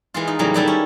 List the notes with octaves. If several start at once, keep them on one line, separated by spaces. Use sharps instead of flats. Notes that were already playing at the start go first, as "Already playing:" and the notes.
E3 G#3 F4
D#4
A2 C#3 E3 F#3 G3 A#3
D#3 G3 E4 A4
C#4